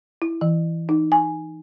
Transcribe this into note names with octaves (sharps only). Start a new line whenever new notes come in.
E4
E3
D#4
G#5